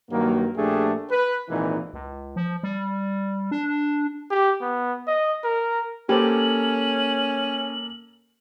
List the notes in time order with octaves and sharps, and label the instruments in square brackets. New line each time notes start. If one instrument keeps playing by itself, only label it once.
[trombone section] G2 D#3 F#3 A#3
A#1 A3 D4 G4 G#4
B4
G#1 A#2 E3 D#4
[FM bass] C#2
F3
G3
D4
[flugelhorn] G4
B3
D#5
A#4
[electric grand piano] A#3 A4 [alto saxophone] C#4 [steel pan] G4 C5 [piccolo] F#7